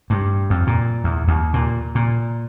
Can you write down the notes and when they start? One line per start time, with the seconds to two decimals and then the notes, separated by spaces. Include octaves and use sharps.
0.10 G2
0.50 F2
0.67 A#2
1.04 E2
1.28 D#2
1.53 A#2
1.95 A#2